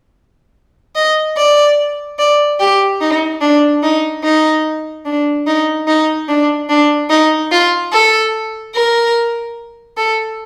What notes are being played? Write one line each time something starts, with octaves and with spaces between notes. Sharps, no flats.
D#5
D5
D5
G4
D#4
D4
D#4
D#4
D4
D#4
D#4
D4
D4
D#4
F4
A4
A#4
A4